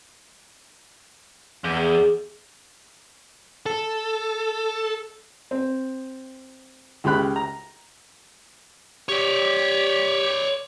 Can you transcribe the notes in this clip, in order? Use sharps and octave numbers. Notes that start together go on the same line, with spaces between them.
E2 G#4
A4
C4
C#2 C#3 G4 B5 F#6
A#5
G4 C#5 D5